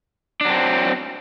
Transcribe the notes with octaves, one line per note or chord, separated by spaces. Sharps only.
F#3 C4 D4